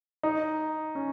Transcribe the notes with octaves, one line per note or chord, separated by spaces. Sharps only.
D#4
C#4